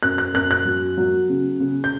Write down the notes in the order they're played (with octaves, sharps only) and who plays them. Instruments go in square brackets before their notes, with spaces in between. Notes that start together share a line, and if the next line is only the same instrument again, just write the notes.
[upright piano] F#2 F#6
F#6
F#2 F#6
F#6
F#3
F#3
C#3
C#3
G6